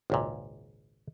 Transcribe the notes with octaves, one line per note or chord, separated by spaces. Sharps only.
G#1 C#2 A#2